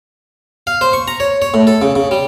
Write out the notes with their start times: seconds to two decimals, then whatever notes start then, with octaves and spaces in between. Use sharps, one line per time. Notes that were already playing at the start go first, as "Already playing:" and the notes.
0.67 F5
0.81 C5
0.93 C#6
1.08 A#5
1.20 C#5
1.42 C#5
1.54 A2
1.67 A4
1.82 C#3
1.96 C#3
2.11 G3